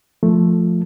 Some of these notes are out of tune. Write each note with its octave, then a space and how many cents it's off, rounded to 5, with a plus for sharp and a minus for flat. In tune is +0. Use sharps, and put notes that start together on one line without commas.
F3 +0 A3 +0